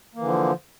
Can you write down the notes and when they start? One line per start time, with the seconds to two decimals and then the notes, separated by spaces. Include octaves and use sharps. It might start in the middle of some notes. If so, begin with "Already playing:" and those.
0.15 A#3
0.18 E3
0.22 D3
0.26 F3